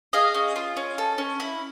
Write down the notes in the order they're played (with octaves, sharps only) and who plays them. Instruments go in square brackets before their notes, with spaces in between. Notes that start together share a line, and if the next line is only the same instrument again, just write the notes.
[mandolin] G#4 D#5 F5
C#4
F4
C#4
A4
C#4
E4